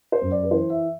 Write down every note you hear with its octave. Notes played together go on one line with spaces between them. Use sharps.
C5
F#2
D5
B4
E3 C5
E5